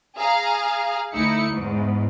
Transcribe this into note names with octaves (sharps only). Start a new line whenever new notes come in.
G#4 F5 A#5
D2 A3 D#4 E4 C#7
E2 G#2